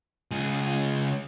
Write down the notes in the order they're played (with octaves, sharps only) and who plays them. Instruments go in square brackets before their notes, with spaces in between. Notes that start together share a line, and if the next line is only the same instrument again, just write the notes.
[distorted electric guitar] C#2 G#4